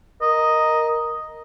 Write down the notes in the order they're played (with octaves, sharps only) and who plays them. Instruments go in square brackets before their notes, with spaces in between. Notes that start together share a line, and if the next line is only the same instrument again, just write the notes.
[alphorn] A#4 [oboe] D#5